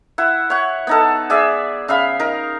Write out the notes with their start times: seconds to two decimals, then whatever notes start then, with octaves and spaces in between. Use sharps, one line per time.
0.18 E4 F#5
0.50 C#5 F#5
0.87 B3 D#4 A4
1.30 G#4 D5 E5
1.88 C#3 E5 F5 B5
2.20 D#4 A#4